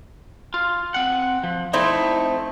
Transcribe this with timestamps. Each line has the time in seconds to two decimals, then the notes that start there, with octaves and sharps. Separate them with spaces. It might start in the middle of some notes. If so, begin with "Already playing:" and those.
0.54 F4
0.94 C4 F#5
1.43 F3
1.73 A3 C4 D#4 E4